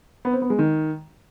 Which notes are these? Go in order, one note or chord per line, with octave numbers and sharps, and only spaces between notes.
B3
C4
B3
G#3
D#3